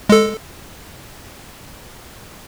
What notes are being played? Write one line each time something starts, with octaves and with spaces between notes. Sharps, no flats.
G#3 A4